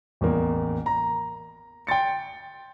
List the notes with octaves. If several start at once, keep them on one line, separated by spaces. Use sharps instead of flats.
A1 E2 A#3
A#5
G5 C6 A6 C#7